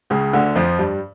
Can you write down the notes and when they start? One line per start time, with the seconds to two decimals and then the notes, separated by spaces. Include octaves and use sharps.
0.10 C#2 C#3
0.33 D2 D3
0.56 F2 F3
0.79 G2 G3